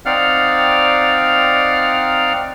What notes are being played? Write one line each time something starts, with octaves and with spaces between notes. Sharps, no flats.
C4 D#4 D5 F5 F#5 F6